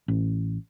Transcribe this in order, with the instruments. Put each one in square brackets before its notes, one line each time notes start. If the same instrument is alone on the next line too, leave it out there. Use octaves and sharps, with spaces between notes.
[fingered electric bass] A1